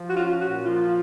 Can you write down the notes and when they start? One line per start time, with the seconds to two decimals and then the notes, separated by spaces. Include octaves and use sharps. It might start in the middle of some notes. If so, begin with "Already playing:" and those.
Already playing: F3
0.10 F#4
0.17 C#4 F4
0.41 A#2 F#4
0.66 F3 F4